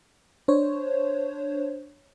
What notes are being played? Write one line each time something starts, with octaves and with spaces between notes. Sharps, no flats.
D4 C5 C#5